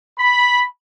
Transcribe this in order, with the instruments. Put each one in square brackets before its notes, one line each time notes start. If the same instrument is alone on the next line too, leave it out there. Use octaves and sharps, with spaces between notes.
[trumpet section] B5